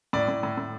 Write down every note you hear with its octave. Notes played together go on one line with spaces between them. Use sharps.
A2 D5
A2
A2
A2